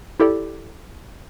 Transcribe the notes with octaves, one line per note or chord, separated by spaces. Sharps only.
E4 G4 A4 D5